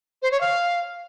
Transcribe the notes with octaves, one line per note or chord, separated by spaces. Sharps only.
C5
C#5
F5